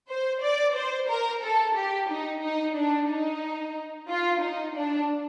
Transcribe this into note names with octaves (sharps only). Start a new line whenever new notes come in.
C5
D5
C5
A#4
A4
G4
D#4
D#4
D4
D#4
F4
D#4
D4